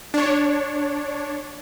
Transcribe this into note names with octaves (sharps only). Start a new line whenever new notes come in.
D4 C#5